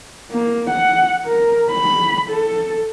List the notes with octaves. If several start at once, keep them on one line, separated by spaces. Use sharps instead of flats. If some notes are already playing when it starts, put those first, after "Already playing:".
A#3
F#5
A#4
B5
A4